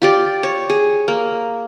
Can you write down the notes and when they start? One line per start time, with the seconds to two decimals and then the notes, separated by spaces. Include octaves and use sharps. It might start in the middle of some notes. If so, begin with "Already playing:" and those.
0.02 F4 G4 D5
0.43 C#5
0.70 G#4
1.08 A#3